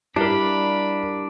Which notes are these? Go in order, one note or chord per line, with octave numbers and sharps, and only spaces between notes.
G3 D4 E4 A#4 F5 B5